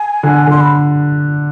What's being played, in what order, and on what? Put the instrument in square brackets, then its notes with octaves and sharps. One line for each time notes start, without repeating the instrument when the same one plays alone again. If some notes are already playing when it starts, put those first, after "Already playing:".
Already playing: [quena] G#5
[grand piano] D3
[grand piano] D3 [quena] C6
[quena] B5